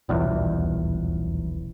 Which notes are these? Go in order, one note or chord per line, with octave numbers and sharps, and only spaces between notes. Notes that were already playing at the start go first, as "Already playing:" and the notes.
D#1 B1 E2